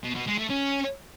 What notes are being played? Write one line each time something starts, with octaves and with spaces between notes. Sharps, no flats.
B2
B2
G#3
A3
C#4